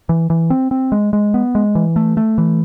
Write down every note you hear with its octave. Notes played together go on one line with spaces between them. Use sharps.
E3
E3
C4
C4
G#3
G#3
B3
G#3
E3
A3
A3
E3